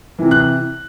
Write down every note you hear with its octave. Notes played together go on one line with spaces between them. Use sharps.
C3 E3
F#6